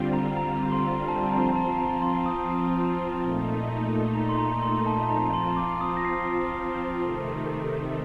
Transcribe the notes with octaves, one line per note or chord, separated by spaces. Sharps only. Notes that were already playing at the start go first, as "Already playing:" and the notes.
Already playing: D3 G3 C4 F4
A#5
A#5
C6
A#5
A5
F3 C4 F4 A#5
A5
A#5
C6
D#6
A#2 A3 D#4
A#5
C6
A#5
C6
A5
F3 C4 F4 A#5
C6
D6
D#6
A#6
C7
C3 D#3 A3